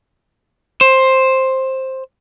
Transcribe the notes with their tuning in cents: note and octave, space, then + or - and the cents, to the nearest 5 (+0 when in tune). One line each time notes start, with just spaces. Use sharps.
C5 +10